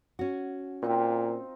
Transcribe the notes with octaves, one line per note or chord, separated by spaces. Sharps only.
C#4 F#4
A#2 C4 D#4 F4